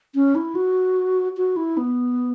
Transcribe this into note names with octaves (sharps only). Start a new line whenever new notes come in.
C#4
E4
F#4
F#4
E4
B3